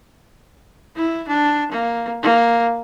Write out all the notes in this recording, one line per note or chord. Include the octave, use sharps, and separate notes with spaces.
E4
D4
A#3
A#3